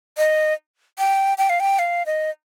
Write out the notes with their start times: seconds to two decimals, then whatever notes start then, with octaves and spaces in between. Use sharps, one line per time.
0.17 D#5
0.98 G5
1.38 G5
1.49 F5
1.60 G5
1.79 F5
2.06 D#5